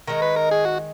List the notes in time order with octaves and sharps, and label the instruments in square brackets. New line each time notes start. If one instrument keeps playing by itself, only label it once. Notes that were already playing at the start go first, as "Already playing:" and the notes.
[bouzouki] D#3 G#3 D#4 [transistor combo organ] A#4
[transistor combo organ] B4
A#4
G#4
F#4